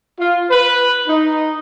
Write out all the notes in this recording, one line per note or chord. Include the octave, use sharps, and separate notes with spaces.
F4
B4
D#4